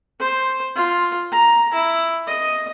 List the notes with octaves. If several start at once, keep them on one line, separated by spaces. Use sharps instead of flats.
C5
F4
A#5
E4
D#5